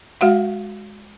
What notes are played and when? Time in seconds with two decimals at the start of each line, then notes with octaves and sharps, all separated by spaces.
0.21 G#3 F#4 F5 F#5